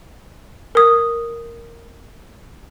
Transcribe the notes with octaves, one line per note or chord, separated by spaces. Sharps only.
A#4 D#6